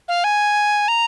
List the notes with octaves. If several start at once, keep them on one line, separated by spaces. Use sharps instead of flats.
F5
G#5
A#5